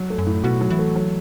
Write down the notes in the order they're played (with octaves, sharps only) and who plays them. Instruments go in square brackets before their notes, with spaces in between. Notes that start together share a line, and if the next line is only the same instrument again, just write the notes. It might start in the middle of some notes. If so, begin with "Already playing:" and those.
Already playing: [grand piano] F#3
A3
[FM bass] F#2
[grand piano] A2
[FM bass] B2 [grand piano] F#4
[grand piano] F#3
[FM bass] E3
[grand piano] A3
F#3